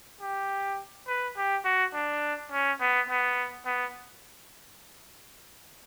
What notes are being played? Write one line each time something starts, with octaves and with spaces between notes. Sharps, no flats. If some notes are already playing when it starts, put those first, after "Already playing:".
G4
B4
G4
F#4
D4
C#4
B3
B3
B3